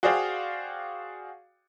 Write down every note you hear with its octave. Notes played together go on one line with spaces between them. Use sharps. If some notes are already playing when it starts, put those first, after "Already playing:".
F#4 G#4 C5 D5 F5 G5